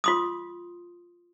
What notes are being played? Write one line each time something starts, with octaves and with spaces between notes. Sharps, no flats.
F4 C6 D#6